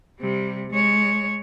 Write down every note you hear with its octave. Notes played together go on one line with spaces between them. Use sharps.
C3 G3
G#3 C#5